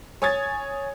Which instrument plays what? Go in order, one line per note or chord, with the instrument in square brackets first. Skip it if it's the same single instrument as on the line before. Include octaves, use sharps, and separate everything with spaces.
[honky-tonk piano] C#5 G#5 D#6 G#6 A6